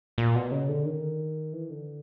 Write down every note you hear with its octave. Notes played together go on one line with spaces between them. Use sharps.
A#2
B2
C#3
D3
D#3
E3
D3